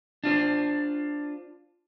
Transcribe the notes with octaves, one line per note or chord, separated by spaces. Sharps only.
D4 F4 C5